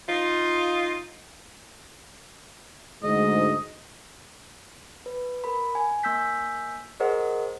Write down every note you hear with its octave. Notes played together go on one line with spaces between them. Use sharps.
D#4 F4
D2 G#2 D#5
B4
A#4 B5
G#5
A#3 G#5 E6 G6 B6
G#4 A#4 C5 D#5 F#5